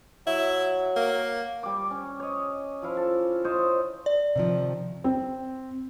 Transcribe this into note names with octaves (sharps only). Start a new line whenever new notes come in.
F#3 E4
A#3
G3 D6
C#4
C#5 D#5
F3 E4 F5
A4
C5 C#5 D#5 F5
D5
C3 D#3 F3
C4